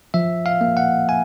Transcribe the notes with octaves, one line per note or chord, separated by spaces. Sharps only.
F3 E5
F5
A#3
F#5
G#5